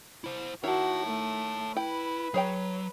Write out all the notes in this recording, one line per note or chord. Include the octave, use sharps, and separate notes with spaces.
E4 C5
D#3 E4 F#4 C#5 A5
A3
E4 B4 G5
F#3 G#4 C#5 G5